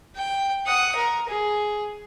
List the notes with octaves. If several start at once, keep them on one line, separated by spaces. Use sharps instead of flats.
G5
F#5 D#6
A#4
G#4